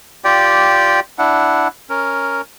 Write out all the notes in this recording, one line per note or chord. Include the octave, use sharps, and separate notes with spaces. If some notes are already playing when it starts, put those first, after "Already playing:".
F4 G4 D5 G5
D4 E4 F#5
C#4 A#4